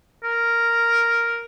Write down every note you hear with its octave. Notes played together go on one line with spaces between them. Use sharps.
A#4